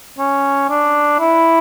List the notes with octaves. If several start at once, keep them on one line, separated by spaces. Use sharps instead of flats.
C#4
D4
E4